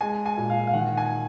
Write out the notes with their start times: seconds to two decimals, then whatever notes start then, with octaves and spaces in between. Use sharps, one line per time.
0.01 G#3 G#5
0.26 G#5
0.37 A#2
0.50 F5
0.67 F5
0.73 D#3 F#5
0.97 G#5